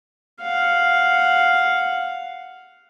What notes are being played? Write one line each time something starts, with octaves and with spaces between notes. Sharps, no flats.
F5 F#5